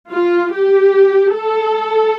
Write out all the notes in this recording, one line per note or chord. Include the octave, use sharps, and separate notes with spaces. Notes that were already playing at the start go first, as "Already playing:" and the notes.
F4
G4
A4